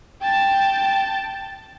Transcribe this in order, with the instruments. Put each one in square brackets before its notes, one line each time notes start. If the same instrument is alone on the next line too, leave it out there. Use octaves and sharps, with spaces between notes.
[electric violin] G5 A5